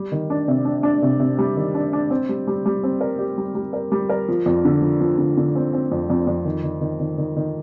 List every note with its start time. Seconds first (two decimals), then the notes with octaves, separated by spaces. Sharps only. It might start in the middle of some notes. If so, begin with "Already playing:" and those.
Already playing: G3
0.12 D#3
0.30 D4
0.48 C3
0.65 D4
0.83 D4
1.02 C3
1.20 C3
1.38 G3
1.56 D#3
1.75 D4
1.93 D4
2.10 C4
2.29 G3
2.47 G3
2.66 G3
2.84 C4
3.01 A#4
3.19 G4
3.38 G3
3.55 G3
3.73 A#4
3.92 G3
4.09 A#4
4.28 F3
4.46 F2
4.65 D3
4.82 F3
5.01 F3
5.18 D3
5.37 D3
5.55 C4
5.73 C4
5.92 F2
6.10 F2
6.27 F2
6.45 D#3
6.63 D#3
6.81 D#3
7.00 D#3
7.18 D#3
7.36 D#3